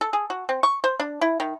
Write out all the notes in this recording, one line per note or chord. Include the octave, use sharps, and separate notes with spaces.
A4
G#4
F#4
C4
C#6
C5
D4
E4
D#3